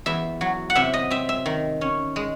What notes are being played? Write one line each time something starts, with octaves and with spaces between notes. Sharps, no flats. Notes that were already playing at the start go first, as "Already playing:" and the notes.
E2 E5
F#3
F#5
C3 E5
D#5
C4 E5
E5
D#3
C#4
G#3